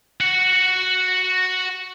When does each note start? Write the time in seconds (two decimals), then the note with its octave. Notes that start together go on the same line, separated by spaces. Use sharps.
0.20 F#4 F#5